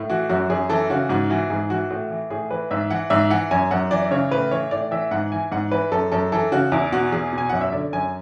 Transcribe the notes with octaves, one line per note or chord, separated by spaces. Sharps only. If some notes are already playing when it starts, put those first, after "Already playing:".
Already playing: A2
E3 F#4
F#2 F#4
F#2 G#4
E3 A4
C#3 F#4
G#2 F#4
E3 F#4
G#2 G#4
E3 F#4
A2 F#4
E3
A2 G#4
E3 B4
G#2 E5
E3 F#5
G#2 E5
E3 F#5
F#2 G#5
F#2 F#5
E3 D5
C#3 C#5
A2 B4
E3 C#5
A2 D5
E3 E5
G#2 F#5
E3 G#5
G#2 F#5
E3 B4
F#2 A4
F#2 A4
E3 A4
C#3 F#4
E2 E4
B2 F#4
E2 G#4
B2
G#5
F#2 F#5
E5
D3 D5
F#2 G#5